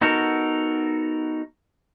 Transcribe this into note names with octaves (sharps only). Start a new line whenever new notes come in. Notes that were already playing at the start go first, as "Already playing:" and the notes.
B3 D#4 F#4 A4 A#4